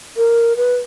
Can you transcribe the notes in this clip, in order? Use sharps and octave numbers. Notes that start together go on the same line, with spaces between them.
A#4
B4